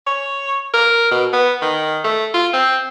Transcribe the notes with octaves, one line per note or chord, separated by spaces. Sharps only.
C#5
A#4
B2
B3
D#3
A3
F4
C4